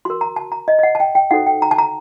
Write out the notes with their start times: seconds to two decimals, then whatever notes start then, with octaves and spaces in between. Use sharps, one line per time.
0.05 F#4 A#4 C6
0.21 A#5
0.36 A5
0.52 A#5
0.68 D#5
0.79 D#5
0.83 F#5
0.95 A5
1.00 G5
1.15 G5
1.31 D#4 F#4 A4 C5 F#5
1.47 G5
1.62 A#5
1.71 A5
1.78 A#5